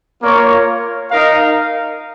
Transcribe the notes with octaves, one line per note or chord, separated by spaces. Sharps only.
A#3 F4 A#4 C#5
D#4 A#4 F5